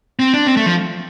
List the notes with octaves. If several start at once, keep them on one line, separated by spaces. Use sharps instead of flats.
C4
D4
C4
A3
F3